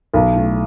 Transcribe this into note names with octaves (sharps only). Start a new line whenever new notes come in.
B1
A2